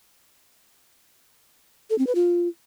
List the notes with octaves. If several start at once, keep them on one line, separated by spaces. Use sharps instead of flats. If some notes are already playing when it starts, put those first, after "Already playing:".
A4
C4
B4
F4